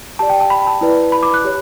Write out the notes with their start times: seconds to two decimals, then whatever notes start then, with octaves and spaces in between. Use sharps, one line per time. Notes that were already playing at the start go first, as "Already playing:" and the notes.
0.19 G4 D5 A5
0.30 G5
0.40 A5
0.50 B5
0.67 A5
0.81 E4 B4 D5
1.12 B5
1.23 D6
1.34 F#6
1.44 G4 C#5